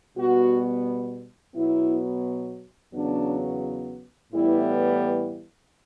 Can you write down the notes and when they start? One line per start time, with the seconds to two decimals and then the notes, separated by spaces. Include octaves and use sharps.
0.16 B2 G3 B3 F#4
1.55 B2 F#3 B3 E4
2.93 E2 C#3 F#3 B3 D4
4.32 A2 E3 G3 B3 E4